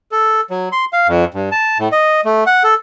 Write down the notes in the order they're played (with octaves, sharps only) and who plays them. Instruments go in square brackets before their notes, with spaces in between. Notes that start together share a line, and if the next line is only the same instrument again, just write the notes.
[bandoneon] A4
F#3
C6
F5
F2
G2
A5
A2
D#5
A3
F#5
A4